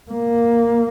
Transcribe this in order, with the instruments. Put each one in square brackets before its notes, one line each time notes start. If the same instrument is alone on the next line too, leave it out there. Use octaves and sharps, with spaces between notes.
[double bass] A#3